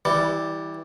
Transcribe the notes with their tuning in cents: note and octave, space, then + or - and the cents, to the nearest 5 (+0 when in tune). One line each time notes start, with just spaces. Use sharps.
E3 -20 G3 +0